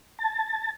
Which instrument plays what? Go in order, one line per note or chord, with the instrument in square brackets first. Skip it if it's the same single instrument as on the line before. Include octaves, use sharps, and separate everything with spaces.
[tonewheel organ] A5